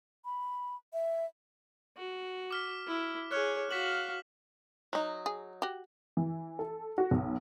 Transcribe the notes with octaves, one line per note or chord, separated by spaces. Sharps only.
B5
E5
F#4
D6 F6 B6
E4
G#4 C#5 F6 F#6
F#4 F5 B6 E7 F#7
F#3 D#4
G#4
F#4 G4
E3
A4
F#4
B1